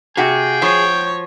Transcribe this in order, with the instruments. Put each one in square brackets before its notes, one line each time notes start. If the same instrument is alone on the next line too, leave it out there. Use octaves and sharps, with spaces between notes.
[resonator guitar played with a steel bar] C3 F#4 [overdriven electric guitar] G#4 [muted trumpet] G5
[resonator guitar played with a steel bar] F3 [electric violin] C#5